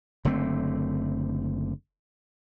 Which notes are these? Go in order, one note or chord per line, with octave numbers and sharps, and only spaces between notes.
F#1 D3 A3 C4